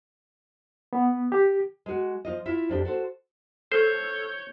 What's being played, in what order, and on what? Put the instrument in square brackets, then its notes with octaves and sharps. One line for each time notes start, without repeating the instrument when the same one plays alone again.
[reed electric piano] B3
G4
[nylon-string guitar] G#3 F#4
F3 F4 D#5
E4 F4 E5
F2 D4 G4
F#4 A4 C5
[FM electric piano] A4 E6 F6 [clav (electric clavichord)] C5 [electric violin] C#5 G6